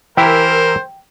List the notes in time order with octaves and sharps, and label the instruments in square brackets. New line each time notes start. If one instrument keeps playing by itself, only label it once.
[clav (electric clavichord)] E3 E4 G4 [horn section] A#4 [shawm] C5 [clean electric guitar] G5